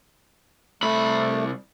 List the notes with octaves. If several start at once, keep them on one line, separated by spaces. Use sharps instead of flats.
C2 A3 B5